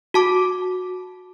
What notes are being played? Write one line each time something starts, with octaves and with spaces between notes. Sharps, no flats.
F#4 A5 D6